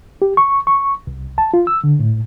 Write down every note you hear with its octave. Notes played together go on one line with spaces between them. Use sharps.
G4
C#6
C#6
C2
A5
F4
E6
D3
A2